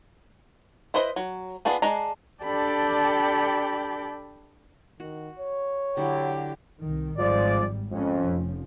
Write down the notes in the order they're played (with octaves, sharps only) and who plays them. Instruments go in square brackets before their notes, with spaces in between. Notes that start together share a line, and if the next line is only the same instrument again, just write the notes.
[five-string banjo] E4 B4 C5 D#5
F#3
B3 D4 F4 G#4
G#3 D4 A#5
[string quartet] D4 G4 A4 D5 G5 B5
[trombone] D#3 [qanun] F#4
[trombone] C#5
[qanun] D3 F#3 E4 [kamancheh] G4
[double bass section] C2 D#3
[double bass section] G#1 G#2 G3 [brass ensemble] F3 G#3 D5
[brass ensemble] F2 [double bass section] G#3 C#4
[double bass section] F1 F3